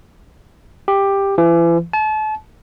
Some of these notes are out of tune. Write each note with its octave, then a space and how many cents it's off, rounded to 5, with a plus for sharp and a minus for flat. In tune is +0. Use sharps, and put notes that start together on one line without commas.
G4 +10
E3 +35
A5 -35